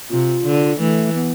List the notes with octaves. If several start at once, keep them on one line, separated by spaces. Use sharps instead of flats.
C3 F4
D3
E3 A3
B3